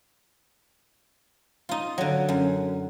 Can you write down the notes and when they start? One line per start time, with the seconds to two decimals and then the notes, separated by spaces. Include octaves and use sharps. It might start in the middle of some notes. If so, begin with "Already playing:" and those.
1.69 D#4 F4
1.98 D3 F#3
2.29 F#2